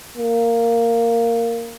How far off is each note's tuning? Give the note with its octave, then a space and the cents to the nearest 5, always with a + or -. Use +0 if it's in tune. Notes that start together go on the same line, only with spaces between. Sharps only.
A#3 -10